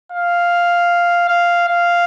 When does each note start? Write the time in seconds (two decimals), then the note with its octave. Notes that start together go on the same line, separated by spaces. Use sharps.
0.12 F5
1.28 F5
1.68 F5